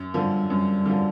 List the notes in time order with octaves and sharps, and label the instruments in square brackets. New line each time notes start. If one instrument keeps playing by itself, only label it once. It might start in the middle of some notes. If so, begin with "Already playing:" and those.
Already playing: [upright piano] F#2
[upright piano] D3 F3 [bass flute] G3
[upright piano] F#2 [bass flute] G3
[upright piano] D3 F3